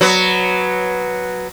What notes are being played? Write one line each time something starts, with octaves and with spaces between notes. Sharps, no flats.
F#3 B3